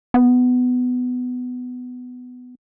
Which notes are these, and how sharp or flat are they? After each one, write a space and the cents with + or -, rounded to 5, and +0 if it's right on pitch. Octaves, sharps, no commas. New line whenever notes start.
B3 +15